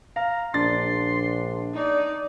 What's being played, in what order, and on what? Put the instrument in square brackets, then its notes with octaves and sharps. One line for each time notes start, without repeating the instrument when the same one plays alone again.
[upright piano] F5 [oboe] A#5
[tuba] A#1 [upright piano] D4 A6 [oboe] C6
[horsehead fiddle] D#4 D5